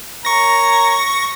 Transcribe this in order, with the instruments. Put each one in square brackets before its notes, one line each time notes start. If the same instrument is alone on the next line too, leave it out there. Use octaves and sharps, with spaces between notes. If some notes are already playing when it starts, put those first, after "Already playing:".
[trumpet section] A#4 C#5 A#5 [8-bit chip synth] C#6 A#6